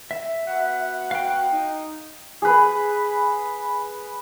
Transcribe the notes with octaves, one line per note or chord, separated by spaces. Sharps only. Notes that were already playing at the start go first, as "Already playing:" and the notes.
E5
B3 F#4 F#5
F5 G5
D#4
G#4 B4